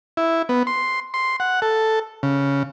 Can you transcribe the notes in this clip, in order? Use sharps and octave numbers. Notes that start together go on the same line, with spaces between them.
E4
B3
C6
C6
F#5
A4
C#3